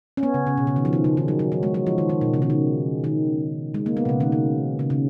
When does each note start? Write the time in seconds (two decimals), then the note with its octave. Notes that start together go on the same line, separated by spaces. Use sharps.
0.17 C#4
0.23 B3
0.34 C#3
0.47 C#3
0.57 B2
0.67 C#3
0.76 D#3
0.85 F3
0.93 D#3
1.04 C#3
1.17 D#3
1.28 F#3
1.39 F#3
1.52 F#3
1.63 G#3
1.74 F#3
1.87 F3
1.98 D#3
2.09 D#3
2.21 B2
2.34 C#3
2.42 D#3
2.50 C#3
3.04 D#3
3.74 G#3
3.86 A#3
3.97 B3
4.05 B2
4.09 C#3
4.20 D#3
4.32 C#3
4.79 C#3
4.90 C#3